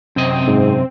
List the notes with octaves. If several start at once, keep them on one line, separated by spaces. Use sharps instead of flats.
F#2 C3 C4 D#5
G#2